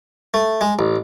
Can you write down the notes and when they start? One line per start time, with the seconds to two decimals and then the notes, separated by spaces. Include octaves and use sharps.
0.34 A3
0.61 G#3
0.79 A1